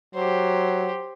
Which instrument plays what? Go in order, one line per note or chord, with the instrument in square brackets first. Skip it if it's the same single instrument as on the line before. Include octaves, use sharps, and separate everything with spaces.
[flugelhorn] F#3 [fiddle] G4 C5